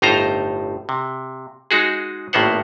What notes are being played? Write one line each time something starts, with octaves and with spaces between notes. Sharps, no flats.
G1 A2 D#4 F4 C5 A#5
C3
G#3 D#4 F#4 G#4
G#1 A2 A#3 B3 C5 F#5